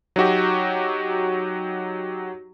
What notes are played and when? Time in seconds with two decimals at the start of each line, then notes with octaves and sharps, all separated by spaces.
0.16 F#3 D#4 F#4 G4